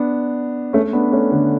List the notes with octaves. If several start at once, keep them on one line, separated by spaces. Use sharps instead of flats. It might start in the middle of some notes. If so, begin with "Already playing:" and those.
Already playing: B3 D4
A3 C#4
B3 D4
A3 C#4
D3